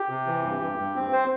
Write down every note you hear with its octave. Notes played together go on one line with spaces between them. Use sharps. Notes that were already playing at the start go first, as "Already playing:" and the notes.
Already playing: G4
C3
E3
G2
G2
G2
C4
C5